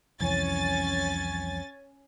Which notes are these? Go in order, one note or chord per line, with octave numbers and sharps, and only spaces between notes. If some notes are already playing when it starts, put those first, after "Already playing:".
C2 F2 E3 C#4 G#5 A6